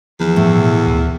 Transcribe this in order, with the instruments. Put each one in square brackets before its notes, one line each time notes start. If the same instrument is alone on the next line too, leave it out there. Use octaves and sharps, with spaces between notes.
[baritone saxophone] E2 [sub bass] F3
[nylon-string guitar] A2
[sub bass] B2
D2